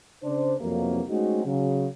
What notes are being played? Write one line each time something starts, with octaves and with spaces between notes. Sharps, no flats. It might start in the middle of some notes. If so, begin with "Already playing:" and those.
C#3 D4 C5
C2 F2 B2 E3 F#3 A#3
G#3 A3 C4 C#4 D#4 F#4
C#3 F#3